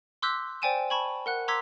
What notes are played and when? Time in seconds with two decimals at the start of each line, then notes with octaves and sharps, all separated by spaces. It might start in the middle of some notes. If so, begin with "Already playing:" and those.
0.22 C6 D6 E6 F#6 G6 B6
0.62 C5 D5 G5 G#5 D#7 E7
0.90 A5 B5 C#6 G#6 F#7
1.26 A#4 F#5 F#6
1.48 A#5 C6 D6 E6 G#6 B6